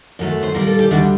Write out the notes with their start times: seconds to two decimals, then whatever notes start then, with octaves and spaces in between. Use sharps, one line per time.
0.19 F#2 F#3 A3
0.43 C5
0.54 A#2 G3 A#4
0.67 A4
0.79 G4
0.91 D2 D3 G3 D4 F#4